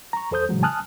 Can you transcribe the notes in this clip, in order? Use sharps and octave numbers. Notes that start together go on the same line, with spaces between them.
A#5 C#6
E2 A4 C5 D#6 G6
A2 C#3 E3 F#3 G#3
G#5 A5 D#6 F6 F#6